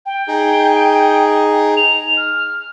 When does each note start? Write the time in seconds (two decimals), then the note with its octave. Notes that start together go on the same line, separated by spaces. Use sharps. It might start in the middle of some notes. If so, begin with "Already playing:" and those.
0.06 G5
0.28 D#4 G#4
1.77 F7
2.17 F6